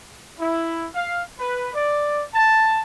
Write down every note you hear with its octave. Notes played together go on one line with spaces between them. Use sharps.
E4
F5
B4
D5
A5